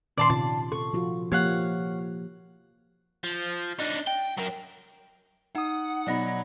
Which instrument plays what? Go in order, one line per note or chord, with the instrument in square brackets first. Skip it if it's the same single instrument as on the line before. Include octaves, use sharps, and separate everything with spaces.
[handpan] A#2 D#3 C#4 [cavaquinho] D5 A5 C6
[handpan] C3 F4 [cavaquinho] A5
[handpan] A4 [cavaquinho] C#6
[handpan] F3 F4 F#4
[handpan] F3 A#3 G4 [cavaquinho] C#5 F5 F#5
[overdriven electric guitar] F3
D4 D#4
G5
F#3 A#4
[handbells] D#4 D#6 [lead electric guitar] F#5
[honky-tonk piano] B2 D#4 A#6 [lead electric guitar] F#3 [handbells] D5 F#5 B5